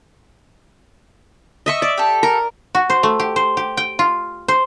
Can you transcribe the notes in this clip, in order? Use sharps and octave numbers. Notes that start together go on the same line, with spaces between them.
D#5 E5 C#6
D5
G4 A4
A#4
F#4
C5
A3
G4
C5
G4
G5
F4
C5